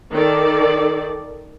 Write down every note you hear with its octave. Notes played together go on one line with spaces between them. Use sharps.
D#3 A4 D5